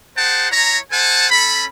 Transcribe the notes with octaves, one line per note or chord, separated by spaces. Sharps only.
G#4 C5 F#5 G5 A5
E4 C#5 A#5
A4 C5 F#5 G#5 A5
C#4 A4 B5